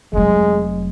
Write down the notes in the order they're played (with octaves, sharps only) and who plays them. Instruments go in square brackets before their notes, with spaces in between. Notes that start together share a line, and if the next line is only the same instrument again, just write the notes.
[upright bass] F1 F#3 [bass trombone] G#3